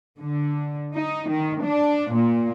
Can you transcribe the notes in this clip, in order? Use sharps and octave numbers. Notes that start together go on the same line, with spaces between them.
D3
D#4
D#3
D4
A#2